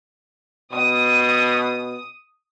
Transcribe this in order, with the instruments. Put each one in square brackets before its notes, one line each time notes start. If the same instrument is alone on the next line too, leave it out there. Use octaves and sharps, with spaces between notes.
[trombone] B2 [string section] D#6